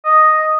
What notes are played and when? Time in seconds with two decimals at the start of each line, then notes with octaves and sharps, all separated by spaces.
0.05 D#5